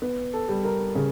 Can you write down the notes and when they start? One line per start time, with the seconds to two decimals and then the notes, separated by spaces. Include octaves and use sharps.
0.02 B3
0.33 A4
0.49 G3
0.65 A#4
0.95 C#3